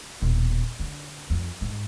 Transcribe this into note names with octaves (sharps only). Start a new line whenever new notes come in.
D#1 B2
D3
F2
G#2